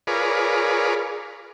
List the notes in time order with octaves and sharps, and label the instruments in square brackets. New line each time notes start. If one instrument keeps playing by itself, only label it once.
[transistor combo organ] F4 G#4 A#4 B4 C#5 D5